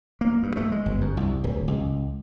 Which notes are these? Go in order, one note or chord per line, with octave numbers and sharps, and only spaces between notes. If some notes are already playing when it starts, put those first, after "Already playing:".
A#3
G2
A3
G#3
G1
F#2
C2
D1
C#2